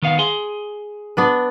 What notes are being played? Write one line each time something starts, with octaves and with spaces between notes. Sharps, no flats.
D#3 B3 F5
G#4 C6
B3 D4 B4